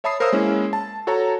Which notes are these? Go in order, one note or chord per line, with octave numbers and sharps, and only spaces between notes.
C#5 E5 A5 B5 D#6 C7
A#4 C5 C#5 F5 D#6 E6
G#3 A#3 C#4 E4
A5
F#4 A4 C#5 A5 A#5